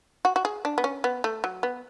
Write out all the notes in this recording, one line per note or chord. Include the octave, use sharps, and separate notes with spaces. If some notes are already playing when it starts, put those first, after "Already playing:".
F#4
F#4
G#4
D4
B3
C#4
B3
A3
F#3
B3